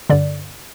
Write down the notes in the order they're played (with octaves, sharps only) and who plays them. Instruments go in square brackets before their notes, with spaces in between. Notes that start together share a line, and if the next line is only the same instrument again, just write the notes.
[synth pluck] G2 D3 D5